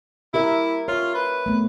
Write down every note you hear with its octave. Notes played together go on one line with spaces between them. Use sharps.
E4 G4 A#4 E5
F4 C#5
B4
A3 B3